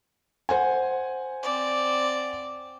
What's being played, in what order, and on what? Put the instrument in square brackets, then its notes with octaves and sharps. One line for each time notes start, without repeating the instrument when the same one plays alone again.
[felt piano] C5 F#5 G#5
[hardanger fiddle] C4 D5